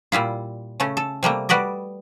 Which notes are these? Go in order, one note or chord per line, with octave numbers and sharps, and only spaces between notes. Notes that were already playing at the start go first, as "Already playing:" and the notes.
A#2 G3 E4 F4
C#3 A3 C#4
A4
C3 G3 A3 A#3
G3 F#4 B4 D5 D#5